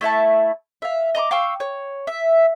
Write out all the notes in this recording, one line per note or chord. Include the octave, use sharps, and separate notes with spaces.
A3 E4 E5 A5
E5 F5
D#5 A#5 C6 D6
F5 G5 C#6 E6
C#5
E5